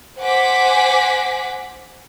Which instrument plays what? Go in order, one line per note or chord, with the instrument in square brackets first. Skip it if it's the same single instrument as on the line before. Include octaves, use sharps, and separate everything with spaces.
[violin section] C5 F#5 G#5 D6 B6